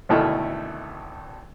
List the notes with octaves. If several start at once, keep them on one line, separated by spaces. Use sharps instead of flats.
G#1 D2 B2 A3 E4 F6